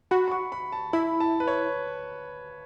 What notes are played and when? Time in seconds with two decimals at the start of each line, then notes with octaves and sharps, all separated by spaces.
0.11 F#4 B5
0.28 B5
0.32 C#6
0.52 B5
0.72 A5
0.93 E4 B5
1.20 A5
1.40 B4
1.48 C#5